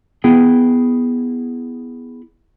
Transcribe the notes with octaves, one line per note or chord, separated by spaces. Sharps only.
B3 E4 G#4 G5